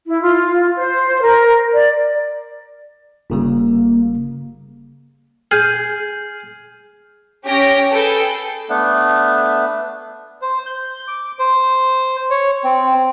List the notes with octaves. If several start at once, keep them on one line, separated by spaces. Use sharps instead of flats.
E4
F4
C5
A#4
D5
G1 C#3 G3 A#3
G#4 F6 G6
C#4 G4 C#5 G5 A#6 D7
G#4 A4 B4 G5
A3 B3 D4
C5
G6
D6
C5
C#5
C4